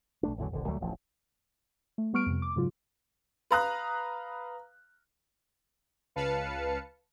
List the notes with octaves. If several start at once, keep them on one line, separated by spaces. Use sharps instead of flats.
B1 A3 D4
A1 E2 D3 F#3
D#1 A#1 D3
D2 F#3 G3 A3
D1 A1 F3
A3
G3 B3 C#6 F6 D7
F2 C3
D6
G#2 C#3 F#3 F4
B4 F5 A#5 D#6 F#6
C#2 B4 F5 A5 C#7